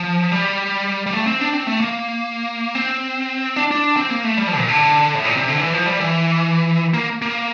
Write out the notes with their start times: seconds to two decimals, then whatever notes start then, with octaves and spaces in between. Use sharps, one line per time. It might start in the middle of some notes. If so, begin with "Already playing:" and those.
Already playing: F3
0.32 G3
1.06 G3
1.13 A3
1.27 C4
1.41 D4
1.53 C4
1.67 A3
1.81 A#3
2.75 C4
3.56 D4
3.71 D4
3.97 C4
4.10 A#3
4.24 A3
4.37 G3
4.48 F3
4.57 A#2
4.68 D3
5.15 A2
5.25 A#2
5.37 C3
5.48 D3
5.60 E3
5.73 F3
5.86 G3
6.00 E3
6.94 A#3
7.22 A#3